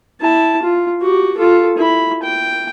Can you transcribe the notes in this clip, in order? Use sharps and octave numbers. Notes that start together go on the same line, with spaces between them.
E4 A5
F4
F#4 G4
F4 A4
E4 B5
G5